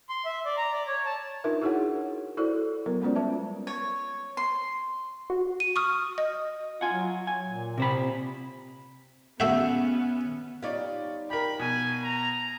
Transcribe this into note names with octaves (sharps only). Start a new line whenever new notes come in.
C6
E5
D5
A#5
D5
C#5
A5
D4 D#4 F4 A#4 B4 E5
E4 F#4 G#4 A#4 C#5 F#5
E4 F#4 A4 C5 D5
F#3 B3 A#4
G#3 B3 C#4 F4 C5 D5
G3 B4 E5 A5
C#5
C6
F#4
D#7
C#6 D#6 F6
D#5
F4 F#5 G#5
F#3
G#5
A#2
C3 C5 B5
A3 B3 C#4 F#4 G4 E5 E6
G3 D#4 F4 C#5 D5
G4 A#4 B5
B2 G#5
A#5